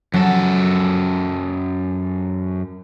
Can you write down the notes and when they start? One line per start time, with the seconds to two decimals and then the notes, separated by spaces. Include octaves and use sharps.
0.14 F#2 F#3 A4